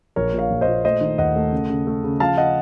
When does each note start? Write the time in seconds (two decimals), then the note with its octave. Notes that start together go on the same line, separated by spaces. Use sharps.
0.16 A#1 A#4 C#5
0.33 A#2
0.38 C#5 F5
0.50 A#1
0.61 C5 D#5
0.67 A#2
0.85 A3 C5 D#5
1.01 D#3
1.18 D#2 D#5 F#5
1.36 A3
1.52 C#3
1.70 C#3
1.87 A3
2.04 C#3
2.20 F3 F5 A5
2.37 D#5 F#5